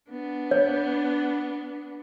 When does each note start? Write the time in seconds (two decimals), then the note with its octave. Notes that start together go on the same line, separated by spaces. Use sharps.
0.10 B3 D4
0.51 C#5